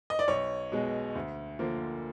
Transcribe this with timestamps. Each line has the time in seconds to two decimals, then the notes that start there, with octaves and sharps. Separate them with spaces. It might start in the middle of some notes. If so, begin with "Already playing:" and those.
0.10 D#5
0.19 D5
0.28 B1 C#5
0.72 B2 G#3
1.15 D2
1.59 D3 F3 A#3